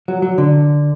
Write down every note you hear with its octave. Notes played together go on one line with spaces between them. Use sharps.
F#3
F#3
D3